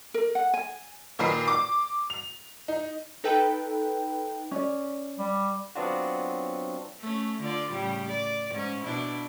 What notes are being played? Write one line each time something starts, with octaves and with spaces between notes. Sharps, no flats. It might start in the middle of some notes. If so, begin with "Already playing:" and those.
A#4
F#5
G#5
A#2 D#3 A#4 B4 C7
D6
F7
D#4
D#4 A4 B4 G5
C#4 D5
G3
F#3 B3 C4 D4 F4 F#4
A3 C#4
D3 F4 D5
A2 C#3 G3
D5
G#2 C#4
B2 D4 E4